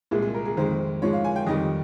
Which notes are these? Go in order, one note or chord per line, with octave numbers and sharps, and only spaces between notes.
C2 A#2 G#3 G#4
G#4
A#4
G#4
F2 D#3 G#3 C5
G#2 F3 G#3 C#5
F5
G#5
G5
F2 D#3 G3 D#5